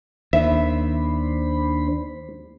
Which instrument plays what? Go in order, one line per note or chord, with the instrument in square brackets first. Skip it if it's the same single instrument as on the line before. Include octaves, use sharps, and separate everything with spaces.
[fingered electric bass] D#2 [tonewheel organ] D4 C5 B5 [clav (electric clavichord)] E5